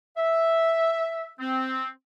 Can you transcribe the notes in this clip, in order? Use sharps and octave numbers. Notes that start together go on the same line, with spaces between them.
E5
C4